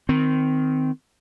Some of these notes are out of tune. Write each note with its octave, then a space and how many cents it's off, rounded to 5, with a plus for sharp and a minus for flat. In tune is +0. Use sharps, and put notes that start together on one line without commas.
D#3 +0 C4 -20